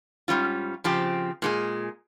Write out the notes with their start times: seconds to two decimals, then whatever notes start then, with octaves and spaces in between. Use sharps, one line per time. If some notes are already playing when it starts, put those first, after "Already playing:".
0.28 G#2 G3 C#4 F4
0.84 C#3 F3 C4 G4
1.42 A#2 G#3 D#4 G#4